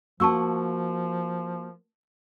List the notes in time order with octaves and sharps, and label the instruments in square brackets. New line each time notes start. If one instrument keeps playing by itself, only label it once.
[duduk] F3 [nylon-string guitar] A#3 F#4 [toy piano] A5 C#6 E6